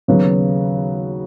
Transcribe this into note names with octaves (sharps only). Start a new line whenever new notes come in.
D#2 C#3 F#3 B3